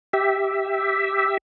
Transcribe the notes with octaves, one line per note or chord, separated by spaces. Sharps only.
G4 E5